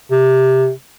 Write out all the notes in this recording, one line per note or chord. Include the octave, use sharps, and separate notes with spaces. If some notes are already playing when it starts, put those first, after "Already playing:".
C3